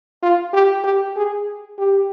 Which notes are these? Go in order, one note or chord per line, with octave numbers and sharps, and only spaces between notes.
F4
G4
G4
G#4
G4